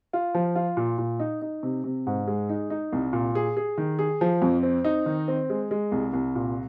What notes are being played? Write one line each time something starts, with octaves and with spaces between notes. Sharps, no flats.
F4
F3
F4
A#2
A#2
D#4
D#4
C3
C3
G#2
G#3
D#4
D#4
C2
A#2
G#4
G#4
D#3
G#4
F3
F2
C4
D#4
D#3
C4
G#3
G#3
C2
C2
A#2